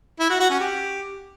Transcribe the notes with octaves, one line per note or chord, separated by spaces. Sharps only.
E4
F#4
F#4
C#4
G4